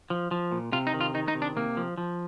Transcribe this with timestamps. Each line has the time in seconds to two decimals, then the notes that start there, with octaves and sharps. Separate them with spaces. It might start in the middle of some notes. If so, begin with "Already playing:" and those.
0.10 F3
0.31 F3
0.52 A#2
0.72 C3 F4
0.87 D#4
0.94 D#3
1.01 F4
1.14 D#3 D#4
1.28 D#4
1.35 C3
1.42 D4
1.56 C3 A#3
1.77 F3
1.98 F3